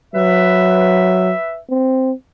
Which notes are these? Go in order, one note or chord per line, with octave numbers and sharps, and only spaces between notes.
F#3 B4 E5
C4